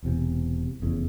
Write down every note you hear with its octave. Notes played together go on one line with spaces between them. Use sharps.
E1 E2 C3
F1 E2 C#3